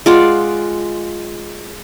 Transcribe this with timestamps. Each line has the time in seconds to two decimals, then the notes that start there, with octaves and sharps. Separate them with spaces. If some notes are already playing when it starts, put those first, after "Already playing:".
0.06 G#3 F4 D5 F#5